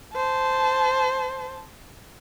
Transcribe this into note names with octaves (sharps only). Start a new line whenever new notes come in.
C5 A5